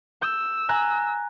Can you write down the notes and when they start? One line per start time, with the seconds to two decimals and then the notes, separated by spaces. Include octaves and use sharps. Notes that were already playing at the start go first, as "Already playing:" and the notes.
0.22 E6 G6
0.69 G#5 A#5 F#6